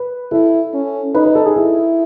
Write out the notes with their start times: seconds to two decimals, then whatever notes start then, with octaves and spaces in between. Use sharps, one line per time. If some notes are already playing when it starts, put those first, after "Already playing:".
Already playing: B4
0.32 E4 A4
0.74 C#4
1.14 D#4 B4
1.25 B4
1.35 A4
1.46 G#4
1.56 E4 A4